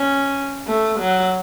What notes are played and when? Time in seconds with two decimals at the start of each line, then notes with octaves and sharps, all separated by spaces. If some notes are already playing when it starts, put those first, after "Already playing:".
Already playing: C#4
0.67 A3
1.00 F#3